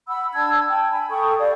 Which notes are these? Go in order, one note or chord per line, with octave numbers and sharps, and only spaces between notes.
F#5 B5 E6
D4 A5 E6 G#6
G5
G#5 B5
A4 G5 C#6 D#6
G4 D5 F5